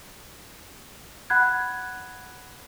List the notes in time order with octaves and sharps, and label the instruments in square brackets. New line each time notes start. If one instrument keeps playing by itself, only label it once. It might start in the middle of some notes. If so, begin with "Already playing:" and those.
[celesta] F#5 B5 F#6 G#6